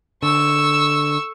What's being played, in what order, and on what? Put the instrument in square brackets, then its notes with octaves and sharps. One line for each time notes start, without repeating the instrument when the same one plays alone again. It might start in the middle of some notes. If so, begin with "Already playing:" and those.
[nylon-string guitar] D3 [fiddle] C#6 E6